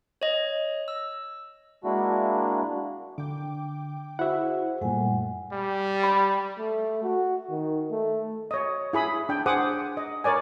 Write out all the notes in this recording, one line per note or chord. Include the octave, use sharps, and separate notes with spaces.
C#5 D#5
E6
G#3 A#3 D4 E4 F#4
D3 G5 D6
E4 F#4 G#4 C5 E5 F#5
F#2 A#2 G3 A3 F#5 G#5
G3
B5
A3
F#4
D#3
A3
C#5 D#5
E4 G#4 B5 D#6
D4 G5
G#4 C5 F#5 D6 D#6
D#5
A#4 C#5 D5 G#5